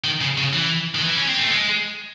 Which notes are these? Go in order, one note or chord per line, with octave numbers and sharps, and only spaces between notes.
D#3
C#3
C#3
E3
D#3
E3
C#4
C4
A3
G#3